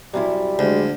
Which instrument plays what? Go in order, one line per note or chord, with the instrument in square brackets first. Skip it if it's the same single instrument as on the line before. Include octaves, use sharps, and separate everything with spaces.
[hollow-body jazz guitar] F#2 C3 E4 [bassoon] G3
[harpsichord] D2 [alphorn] G#3